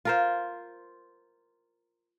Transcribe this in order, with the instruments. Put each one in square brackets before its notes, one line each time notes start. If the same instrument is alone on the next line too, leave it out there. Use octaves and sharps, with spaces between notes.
[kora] F4 A#4 C5